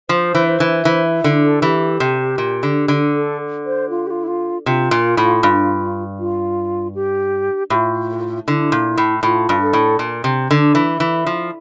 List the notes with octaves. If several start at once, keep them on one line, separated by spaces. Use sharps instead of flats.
F3 C5
E3
C5
E3
E3 C5
D3
A4
E3 G4
C3
A#2
D3
D3
A4
C5
F4
G4
F4
E4
F4
C3 F4
A#2
A2
G2
F4
G4
A2 F4 G4
D3 E4
A#2
A2
A2 F4
G2
A4
A2
A#2
C3
D3
E3
E3
F3